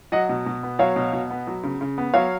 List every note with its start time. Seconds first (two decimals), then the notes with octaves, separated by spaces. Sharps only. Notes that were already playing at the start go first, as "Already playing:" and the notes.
0.12 F#3 D#5 F#5
0.29 B2
0.46 B2
0.63 B3
0.79 F#3 C#5 F5
0.96 B2
1.13 B2
1.31 B3
1.47 F#3
1.63 C#3
1.81 C#3
1.98 B3
2.14 F#3 C#5 F5